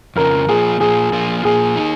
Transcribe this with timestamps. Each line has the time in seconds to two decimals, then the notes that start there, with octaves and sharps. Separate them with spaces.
0.16 F2 C#3 F3 A#4
0.49 A#2 F3 A#3 F4 G#4
0.80 A#2 F3 A#3 F4 G#4
1.12 A#2 F3 A#3 F4
1.45 A#2 F3 A#3 F4 G#4
1.76 A#3 D#4